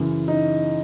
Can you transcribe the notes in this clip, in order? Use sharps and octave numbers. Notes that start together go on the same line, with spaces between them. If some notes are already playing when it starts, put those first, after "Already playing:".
Already playing: F#2 C#3 E3
D#4